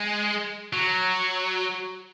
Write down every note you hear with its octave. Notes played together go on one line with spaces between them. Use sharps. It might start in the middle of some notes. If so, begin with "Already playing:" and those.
Already playing: G#3
F#3